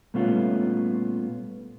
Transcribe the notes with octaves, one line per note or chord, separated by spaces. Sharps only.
A#2 G3 A3 B3 C#4 F4